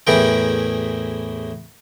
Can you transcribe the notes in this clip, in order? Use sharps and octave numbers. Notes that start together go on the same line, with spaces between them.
E2 A2 E3 G#4 A#4 G5